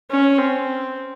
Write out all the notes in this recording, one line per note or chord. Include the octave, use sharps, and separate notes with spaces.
C#4
C4